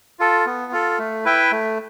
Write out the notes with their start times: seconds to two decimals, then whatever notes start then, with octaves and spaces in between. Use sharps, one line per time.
0.19 F4 A4
0.46 B3
0.72 F4 A4
0.99 A3
1.25 E4 B4 E5 G5
1.52 A3